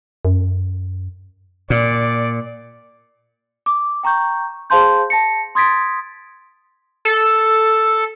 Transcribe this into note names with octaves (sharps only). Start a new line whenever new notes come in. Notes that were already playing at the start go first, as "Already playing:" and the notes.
F#2
A#2 D5
D6
G5 A#5 C#6 G6
G#4 C5 F5 A5 C6 G6
A5 A#6 C#7
C6 D#6 G#6 A6 B6 D7
A4